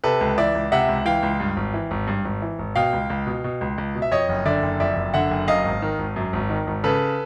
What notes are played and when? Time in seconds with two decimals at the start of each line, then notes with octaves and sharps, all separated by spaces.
0.04 C3 A4 B4
0.21 C#2
0.38 E3 D5 E5
0.55 C#2
0.72 C3 E5 F#5
0.89 C#2
1.05 E3 F5 G5
1.23 C#2
1.40 G2
1.57 G#1
1.74 E3
1.91 G#1
2.08 G2
2.25 G#1
2.42 E3
2.59 G#1
2.76 B2 F5 G5
2.93 C#2
3.10 C#2
3.27 B2
3.44 B2
3.61 C#2
3.78 C#2
3.95 B2
4.02 E5
4.11 F2 C#5 D#5
4.29 F#1
4.45 D3 D5 E5
4.62 F#1
4.80 F2 D5 E5
4.97 F#1
5.14 D3 E5 F#5
5.31 F#1
5.48 F#2 D#5 F5
5.65 G#1
5.82 D#3
5.99 G#1
6.16 F#2
6.33 G#1
6.50 D#3
6.67 G#1
6.84 C#3 A4 B4